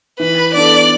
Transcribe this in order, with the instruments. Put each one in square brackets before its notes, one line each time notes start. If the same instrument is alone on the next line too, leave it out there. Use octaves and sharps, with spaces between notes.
[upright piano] E3 [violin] B4
[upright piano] B3 D4 A4 [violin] D5